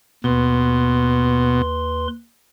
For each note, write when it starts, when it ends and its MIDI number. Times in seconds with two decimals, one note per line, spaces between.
0.24 2.07 39
0.24 1.62 47
0.24 2.07 71
0.24 2.07 84